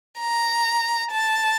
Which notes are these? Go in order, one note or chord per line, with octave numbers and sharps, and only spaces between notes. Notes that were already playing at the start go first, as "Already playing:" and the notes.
A#5
A5